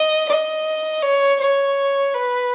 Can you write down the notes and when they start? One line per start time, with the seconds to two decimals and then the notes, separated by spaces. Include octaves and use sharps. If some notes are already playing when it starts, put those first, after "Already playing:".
Already playing: D#5
0.29 D#5
1.03 C#5
1.40 C#5
2.14 B4